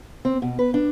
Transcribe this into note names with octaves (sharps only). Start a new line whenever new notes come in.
C4
B2
B4
D4